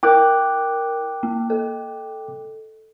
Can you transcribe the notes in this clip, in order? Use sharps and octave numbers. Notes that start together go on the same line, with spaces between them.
E4 A#4 G5 D6 F#6
A#3
A4